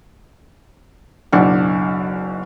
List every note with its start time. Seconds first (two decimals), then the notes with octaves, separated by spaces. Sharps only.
1.32 F#1 B1 D4 F#5